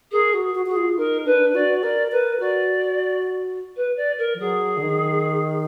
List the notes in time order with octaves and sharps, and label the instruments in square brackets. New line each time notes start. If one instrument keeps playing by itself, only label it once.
[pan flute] G#4 [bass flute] A#4
[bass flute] F#4
F#4
[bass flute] F#4 [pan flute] G#4
[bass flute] F4
[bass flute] D#4 [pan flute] A#4
[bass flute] D4 [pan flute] B4
[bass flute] F#4 [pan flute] D5
[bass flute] A#4 [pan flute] D5
[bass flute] A#4 [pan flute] B4
[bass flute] F#4 [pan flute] D5
[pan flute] B4
D5
A#4
[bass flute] F3
[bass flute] F#3 [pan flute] G#4
[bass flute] D3
D#3